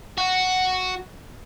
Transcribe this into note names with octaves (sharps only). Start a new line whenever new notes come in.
F#4